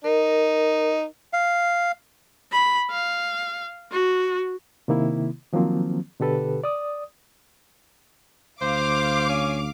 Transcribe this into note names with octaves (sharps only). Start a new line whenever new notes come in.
D#4 A#4
F5
B5
F5
F#4
C3 D#3 A#3 E4
D#3 F3 F#3 A#3 C4
B2 D3 G4 A4 B4
D5 D#6
D2 C5 F5 D6
C#4